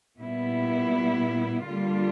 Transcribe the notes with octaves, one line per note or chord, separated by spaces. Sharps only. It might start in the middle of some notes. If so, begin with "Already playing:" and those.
A#2 G3 B3 E4
D3 G3 A#3 D4 F4